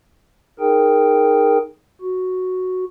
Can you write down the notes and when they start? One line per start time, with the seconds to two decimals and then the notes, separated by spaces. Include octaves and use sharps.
0.60 D#4 G#4 A#4 G5
2.01 F#4